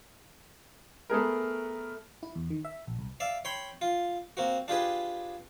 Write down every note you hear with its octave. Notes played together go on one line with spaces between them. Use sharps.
A3 B3 G#4 A#4
E4
E2
D#3
E5
A#1
C2
D5 E5 F5
C#5 G5 B5 C6
F4
A#3 C4 F#4
D4 F4 G4 G#4 B4